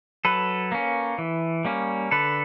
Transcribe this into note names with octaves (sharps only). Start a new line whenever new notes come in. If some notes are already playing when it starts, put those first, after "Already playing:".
F#3 A4 B4
A#3 C#4
E3
G3 A#3 C#4
D3 A4 B4